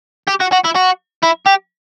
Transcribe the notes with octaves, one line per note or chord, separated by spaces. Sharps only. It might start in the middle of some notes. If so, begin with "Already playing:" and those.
G4
F#4
F#4
E4
F#4
E4
G4